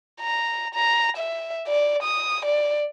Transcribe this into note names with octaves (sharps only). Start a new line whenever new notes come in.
A#5
A#5
E5
D5
D#6
D5